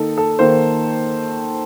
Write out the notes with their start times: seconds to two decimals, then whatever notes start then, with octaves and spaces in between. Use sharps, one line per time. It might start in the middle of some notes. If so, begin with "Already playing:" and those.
Already playing: D#3 A#3 D#4 A4
0.18 A4
0.39 D#3 A#3 D#4 C5